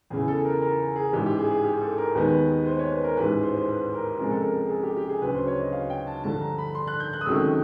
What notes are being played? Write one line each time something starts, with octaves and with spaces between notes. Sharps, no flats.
E2 C#3 E3 G#4
A4
A#4
A#4
G#4
A1 G#2 E3 G4
G4
G#4
G#4
G4
A4
A#4
D#2 D#3 G#3 B3 B4
B4
C5
C#5
B4
A#4
A1 G#2 E3 B4
B4
C5
C5
B4
A#4
C#2 C3 F3 G#3 A#4
A4
A#4
G#4
A4
G4
G4
G#4
D2 C#3 F#3 B4
C5
C#5
D#5
F5
G5
A5
G2 D3 F3 A5
A#5
B5
C6
F#6
G6
F#6
D#6
C#2 C3 D#3 F#3 A3 E6